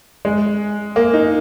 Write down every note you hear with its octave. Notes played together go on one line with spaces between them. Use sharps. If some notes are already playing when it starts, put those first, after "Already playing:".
G#3
A#3
D#4